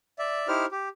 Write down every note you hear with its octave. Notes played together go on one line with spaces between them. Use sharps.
D5 E5
D#4 E4 G4 C5 F6
G4